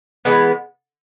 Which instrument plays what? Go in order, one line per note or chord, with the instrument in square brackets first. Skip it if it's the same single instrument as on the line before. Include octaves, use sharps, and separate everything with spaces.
[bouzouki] E3 G#3 B3